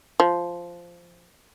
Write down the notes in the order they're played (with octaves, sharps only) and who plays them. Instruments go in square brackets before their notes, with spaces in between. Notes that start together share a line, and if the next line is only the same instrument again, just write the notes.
[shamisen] F3